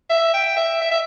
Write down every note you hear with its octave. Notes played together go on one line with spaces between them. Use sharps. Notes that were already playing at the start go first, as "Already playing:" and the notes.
E5
G5
E5
E5
E5